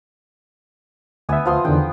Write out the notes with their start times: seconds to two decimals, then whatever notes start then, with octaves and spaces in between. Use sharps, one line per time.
1.29 D2 B3 E5 G#5 D#6
1.46 F3 B3 C6
1.65 E2 D3 D#3 G5